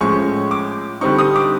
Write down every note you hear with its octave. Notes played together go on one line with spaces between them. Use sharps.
A2 F3 G#3 C#4 C#6
D6
D3 G3 C4 D#4 C#6
D#6
D6